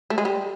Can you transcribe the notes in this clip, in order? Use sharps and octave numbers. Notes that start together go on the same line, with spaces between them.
A3
G#3
G3